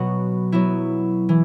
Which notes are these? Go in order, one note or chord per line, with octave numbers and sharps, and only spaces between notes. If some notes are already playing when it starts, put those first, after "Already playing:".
Already playing: B2 F#3 B3 F#4
F#3 B3 E4
E3